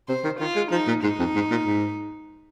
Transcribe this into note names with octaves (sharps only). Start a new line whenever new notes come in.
C3 C5
D#3
D#3 F4
G#3
F3 D#4
A#2
G#2 D#4
F2
G#2
A#2
G#2